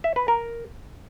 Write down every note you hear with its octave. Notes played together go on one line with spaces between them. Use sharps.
E5
B4
A#4